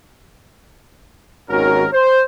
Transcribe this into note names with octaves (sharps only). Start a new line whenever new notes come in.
G#1 D#2 C#4 F#4 A#4
C5